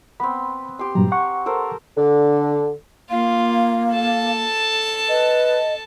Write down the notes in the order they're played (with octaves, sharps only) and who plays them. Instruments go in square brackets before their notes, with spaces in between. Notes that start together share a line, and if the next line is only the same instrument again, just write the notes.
[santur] B3 C4 [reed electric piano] B5
[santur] G4 C6
[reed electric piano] G2 A#2 F#3 [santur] A#5
[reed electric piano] F#5 C#6
[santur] A4 A#4 C5
[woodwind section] D3
[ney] A#3 [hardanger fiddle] F4 [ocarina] F5
[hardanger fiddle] A4 A5
[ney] B4 [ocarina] D#5